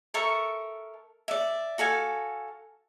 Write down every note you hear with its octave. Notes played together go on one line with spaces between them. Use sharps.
A4 A#4 E5 C#6
D5 E5
F#4 A4 F5 G#5